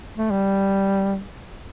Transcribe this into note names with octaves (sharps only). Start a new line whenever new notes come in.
A3
G3